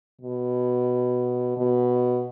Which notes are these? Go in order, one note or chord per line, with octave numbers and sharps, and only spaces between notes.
B2
B2